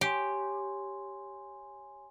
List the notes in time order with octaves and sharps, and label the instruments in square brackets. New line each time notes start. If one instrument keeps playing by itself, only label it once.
[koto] G4 [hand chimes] C#5 G#5 C6